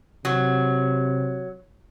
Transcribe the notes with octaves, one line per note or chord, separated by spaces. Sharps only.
C3 F#3